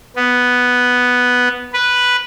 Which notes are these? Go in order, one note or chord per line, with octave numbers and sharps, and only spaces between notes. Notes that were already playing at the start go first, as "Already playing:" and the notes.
B3
B4